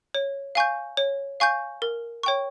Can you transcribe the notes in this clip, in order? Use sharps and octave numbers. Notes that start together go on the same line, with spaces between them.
C#5
F5 G#5 C#6 G6
C#5
F5 G#5 C#6 G6
A#4
C#5 G5 C#6